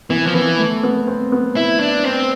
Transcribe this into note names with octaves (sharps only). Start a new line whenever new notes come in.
E3 B3
F3
E3 B3
A3
B3
C4
B3
E4
D4
C4